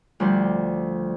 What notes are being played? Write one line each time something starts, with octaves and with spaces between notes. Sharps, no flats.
D2 F3 G3 C5